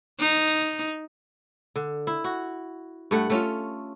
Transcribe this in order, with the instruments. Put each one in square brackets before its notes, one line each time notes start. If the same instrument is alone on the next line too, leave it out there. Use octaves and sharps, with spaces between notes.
[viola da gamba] D#4
[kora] D3
E4
F#4
G2 A3 F#5
A3 C#4 F4